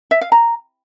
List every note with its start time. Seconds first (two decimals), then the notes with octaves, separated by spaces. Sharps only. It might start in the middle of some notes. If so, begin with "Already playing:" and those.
0.11 E5
0.21 F5
0.32 A#5